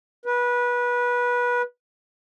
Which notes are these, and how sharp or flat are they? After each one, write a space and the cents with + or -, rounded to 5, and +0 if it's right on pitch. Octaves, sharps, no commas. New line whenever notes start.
B4 -20